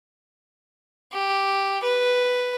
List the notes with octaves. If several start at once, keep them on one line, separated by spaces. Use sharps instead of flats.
G4
B4